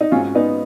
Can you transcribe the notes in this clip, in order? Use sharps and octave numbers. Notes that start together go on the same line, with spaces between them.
D#4
G#2 F#3 C#4 F4
B3 D#4